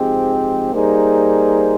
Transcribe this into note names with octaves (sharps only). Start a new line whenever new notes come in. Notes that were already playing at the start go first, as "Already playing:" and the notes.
Already playing: G#2 F3 G#3 C4 G4
G3 A#3 D#4 G#4 C5